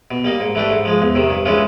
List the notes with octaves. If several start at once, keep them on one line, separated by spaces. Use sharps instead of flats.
B2
G3 A#3 D#4
G#2
E3 A3 D4 G4
G#2
F3 G#3
E2
C3 D#3
G2
E3 G#3 C#4 F4